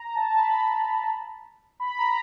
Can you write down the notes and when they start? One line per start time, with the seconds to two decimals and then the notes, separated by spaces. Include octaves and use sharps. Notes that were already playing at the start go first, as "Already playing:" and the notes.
Already playing: A#5
0.15 A5
0.38 B5
1.80 B5
1.98 A#5